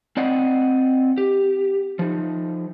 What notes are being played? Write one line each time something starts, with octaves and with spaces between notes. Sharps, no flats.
C4 D5 D#5 F#5 G5
G4
F3 D#4